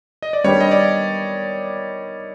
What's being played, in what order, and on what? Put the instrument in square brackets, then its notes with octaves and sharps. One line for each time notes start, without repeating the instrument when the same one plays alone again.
[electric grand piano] D#5
D5
[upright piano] D#3 G3 B3 D4 G4 [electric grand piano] C#5
[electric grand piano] D#5
D5